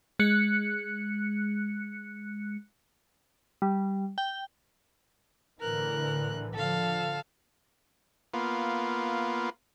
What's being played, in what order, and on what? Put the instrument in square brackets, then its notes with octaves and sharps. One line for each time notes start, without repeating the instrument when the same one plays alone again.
[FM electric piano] G#3 F#6 C#7
[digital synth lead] G3
G5
[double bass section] A2 D3 E3 [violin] A#4 F#6
[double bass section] D3 F3 [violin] A4 F5
[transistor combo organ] A#3 B3 F4